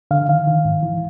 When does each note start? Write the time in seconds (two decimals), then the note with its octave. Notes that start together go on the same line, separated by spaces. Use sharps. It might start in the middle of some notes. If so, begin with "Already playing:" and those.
0.11 D3 F5
0.29 D#3 F5
0.47 D#3
0.65 G#2
0.83 E3